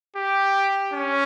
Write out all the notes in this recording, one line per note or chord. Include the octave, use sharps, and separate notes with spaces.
G4
C#4